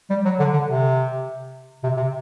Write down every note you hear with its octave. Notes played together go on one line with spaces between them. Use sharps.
G3
F#3
D3
D3
C3
C3
C3